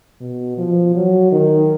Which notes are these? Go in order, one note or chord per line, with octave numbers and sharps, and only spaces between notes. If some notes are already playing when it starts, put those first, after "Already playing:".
B2
F3
F#3
D#3